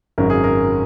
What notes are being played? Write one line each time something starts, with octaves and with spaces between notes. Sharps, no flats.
G#1 F#2 C#3 F#3 A#4
G#4
A#4